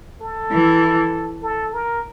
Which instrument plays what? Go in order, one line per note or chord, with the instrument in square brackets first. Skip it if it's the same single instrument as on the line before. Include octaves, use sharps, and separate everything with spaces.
[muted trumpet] A4
[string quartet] E3
[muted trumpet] A4
A#4